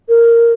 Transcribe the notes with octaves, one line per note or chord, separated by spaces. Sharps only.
A#4